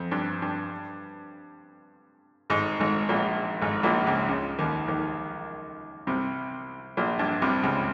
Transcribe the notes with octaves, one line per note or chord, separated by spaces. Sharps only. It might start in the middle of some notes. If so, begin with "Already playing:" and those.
Already playing: F2
G2
G2
G#1 G#2
G#1 G#2
A#1 A#2
G#1 G#2
A#1 A#2
C#2 C#3
C#2 C#3
D#2 D#3
D#2 D#3
C2 C3
A#1 A#2
G2
C2 C3
C#2 C#3